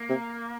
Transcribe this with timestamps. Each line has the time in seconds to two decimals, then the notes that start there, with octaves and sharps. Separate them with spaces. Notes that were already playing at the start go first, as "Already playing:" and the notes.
Already playing: A#3
0.09 C3